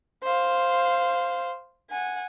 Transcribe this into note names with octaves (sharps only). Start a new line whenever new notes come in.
C5 F5
F#5 G#5